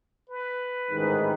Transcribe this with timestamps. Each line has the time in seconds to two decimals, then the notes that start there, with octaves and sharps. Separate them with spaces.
0.30 B4
0.90 A1 G#2 D#3